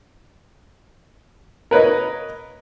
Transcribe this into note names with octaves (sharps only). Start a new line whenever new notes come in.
A#4 B4 C#5 D#5